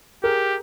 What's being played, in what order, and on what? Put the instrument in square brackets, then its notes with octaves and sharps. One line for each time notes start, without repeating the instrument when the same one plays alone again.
[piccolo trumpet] G4 [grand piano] G#4 A#4